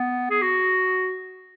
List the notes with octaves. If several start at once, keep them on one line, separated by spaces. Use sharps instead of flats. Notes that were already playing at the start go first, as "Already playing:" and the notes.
Already playing: B3
G#4
F#4